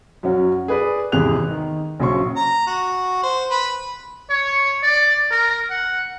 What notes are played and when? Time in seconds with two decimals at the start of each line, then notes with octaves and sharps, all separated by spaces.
0.23 F#2 F#3 C#4 F#4
0.68 G#4 B4 D5
1.12 G#1 E2 C3 G#4 F#6 F7
1.49 D#3
2.00 A#1 C#3 F#3 C6 C#6
2.37 A#5
2.67 F#4
3.23 C5
3.51 B4
4.30 C#5
4.83 D5
5.31 A#4
5.70 F#5